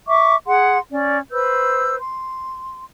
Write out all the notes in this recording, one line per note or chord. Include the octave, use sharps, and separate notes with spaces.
E5 C#6 D6
G#4 F#5 C6
C#4 D5
B4 C5 E6 G6
C6